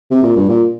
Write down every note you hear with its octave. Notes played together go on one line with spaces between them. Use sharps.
C3
A#2
G2
A#2